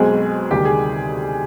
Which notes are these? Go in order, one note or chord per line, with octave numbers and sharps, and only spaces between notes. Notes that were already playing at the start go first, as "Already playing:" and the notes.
Already playing: B1 B2 G#3 C4 G#4
D2 C3 D#3 G3 G4
G#4